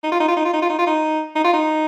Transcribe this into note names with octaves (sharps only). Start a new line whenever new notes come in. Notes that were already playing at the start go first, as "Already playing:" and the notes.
D#4
F4
D#4
F4
D#4
F4
D#4
F4
D#4
F4
D#4
D#4
F4
D#4